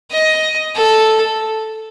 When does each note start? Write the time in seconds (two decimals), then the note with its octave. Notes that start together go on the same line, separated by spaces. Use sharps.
0.11 D#5
0.75 A4